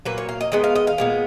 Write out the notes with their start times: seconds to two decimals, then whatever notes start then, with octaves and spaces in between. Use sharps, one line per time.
0.05 A#2 F#3 A#3 B4
0.18 C#5
0.29 F5
0.41 D#5
0.52 D#3 G#3 B3 D#5
0.64 F5
0.75 D#5
0.87 F5
0.98 A#2 G#3 B3